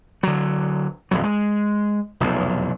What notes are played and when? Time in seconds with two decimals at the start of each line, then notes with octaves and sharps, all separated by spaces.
0.23 D3 F#3
1.11 D#1 F2 F#3
1.24 G#3
2.20 F1 B1 E2